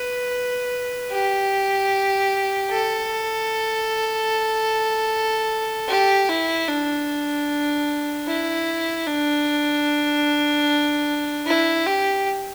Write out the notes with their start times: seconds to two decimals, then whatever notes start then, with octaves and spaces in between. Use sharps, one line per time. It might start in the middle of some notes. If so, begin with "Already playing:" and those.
Already playing: B4
1.11 G4
2.70 A4
5.89 G4
6.29 E4
6.68 D4
8.27 E4
9.07 D4
11.46 E4
11.86 G4